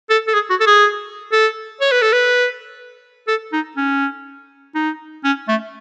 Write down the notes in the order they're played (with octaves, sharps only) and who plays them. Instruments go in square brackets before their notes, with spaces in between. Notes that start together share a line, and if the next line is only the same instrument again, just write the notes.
[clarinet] A4
A4
G#4
F#4
A4
G#4
A4
C#5
B4
A4
B4
A4
D#4
C#4
D#4
C#4
A3